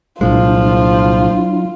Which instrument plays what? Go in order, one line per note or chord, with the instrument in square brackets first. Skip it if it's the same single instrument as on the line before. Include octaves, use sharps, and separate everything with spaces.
[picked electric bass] C2 A#2 G#3 [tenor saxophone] F3 [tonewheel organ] F#3 D4 E4 [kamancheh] F4